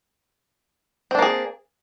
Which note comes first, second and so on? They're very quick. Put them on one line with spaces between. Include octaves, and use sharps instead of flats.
C4 D4 A#3 G#4